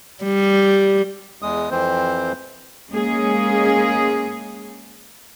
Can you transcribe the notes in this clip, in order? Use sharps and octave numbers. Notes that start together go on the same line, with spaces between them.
G3
E2 G#3 D#6
F2 E3 C4 C5
G#3 A#3 C#4 G#4